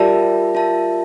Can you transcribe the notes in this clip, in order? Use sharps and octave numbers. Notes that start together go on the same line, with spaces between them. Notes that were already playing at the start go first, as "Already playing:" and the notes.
Already playing: G3 F4 A#4 E5 A5
F4 A#4 E5 A5